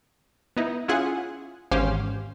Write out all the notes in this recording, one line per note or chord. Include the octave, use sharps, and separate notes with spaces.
B3 D#4 E4
C#4 E4 F4 G#4 F#5 G#5
G#1 E2 C#4 G4 C5 F5